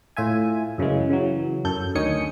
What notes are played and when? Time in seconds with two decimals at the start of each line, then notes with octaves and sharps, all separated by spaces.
0.17 A2 F4 E5 G#5
0.78 F#2 C#3 E3 G#3
1.10 C#3 E3 F#3
1.65 F#2 A4 G6
1.95 D2 D#3 C#4 G#5 D#6 C#7